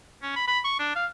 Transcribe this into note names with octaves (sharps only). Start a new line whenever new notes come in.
C#4
B5
B5
C#6
D4
F5